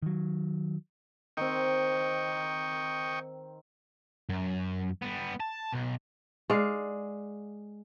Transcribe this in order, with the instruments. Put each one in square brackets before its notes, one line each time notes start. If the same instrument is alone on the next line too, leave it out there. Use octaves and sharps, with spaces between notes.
[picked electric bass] D#3 F#3
[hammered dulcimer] D#3 C4 [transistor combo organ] D#5 G5 C#6
[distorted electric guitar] F#2
G3 B3
A5
B1
[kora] G#3 D5 F5